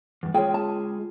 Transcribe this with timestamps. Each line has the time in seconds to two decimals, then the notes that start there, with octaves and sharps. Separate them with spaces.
0.23 E2 G2
0.34 G#3 F4 G#4 C#5 G5
0.54 A5